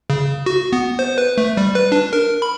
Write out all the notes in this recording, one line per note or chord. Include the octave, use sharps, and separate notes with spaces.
C#3
F#4
B3
C5
B4
A3
G3
B4
D4
A#4
B5